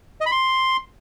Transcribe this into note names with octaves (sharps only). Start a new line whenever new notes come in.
D#5
B5
C6